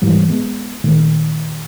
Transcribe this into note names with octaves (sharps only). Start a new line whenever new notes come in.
G#2 E3 G3
G#3 B3
A#2 D#3 A3